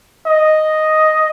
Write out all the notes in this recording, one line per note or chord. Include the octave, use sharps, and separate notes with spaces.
D#5